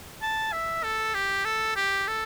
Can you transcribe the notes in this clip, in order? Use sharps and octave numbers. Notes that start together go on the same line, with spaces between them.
A5
E5
A4
G4
A4
G4
A4